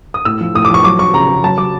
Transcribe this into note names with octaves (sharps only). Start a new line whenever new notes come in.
D#6
A2 E6
F3
A2 D#6
D6
F3 C#6
F#3 D6
F#3 C#6
C#3 A#5
C#3
F#3 A5
F#3 D6